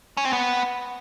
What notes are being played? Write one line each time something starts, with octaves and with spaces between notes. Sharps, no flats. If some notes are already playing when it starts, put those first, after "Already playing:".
C#4
C4
B3